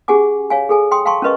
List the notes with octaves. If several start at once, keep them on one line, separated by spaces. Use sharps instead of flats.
C#4 G4 G#4 F#5 G#5 D6
C#5 F5 G#5
G#4 A4 G#5
G5 C6 D#6
F5 G5 A5 C6 C#6
C#4 A#4 B4 D#5 C#6